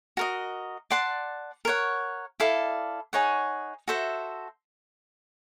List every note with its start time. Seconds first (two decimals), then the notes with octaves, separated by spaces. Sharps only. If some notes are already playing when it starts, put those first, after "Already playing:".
0.17 F#4 A#4 D#5
0.90 D5 F#5 A5 C6
1.65 A#4 C#5 F#5
2.40 E4 A4 D5 F5
3.13 D#4 G#4 C#5 F#5
3.88 F#4 A4 C5 E5